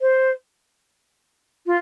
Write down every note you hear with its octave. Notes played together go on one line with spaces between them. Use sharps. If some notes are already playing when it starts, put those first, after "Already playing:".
C5
F4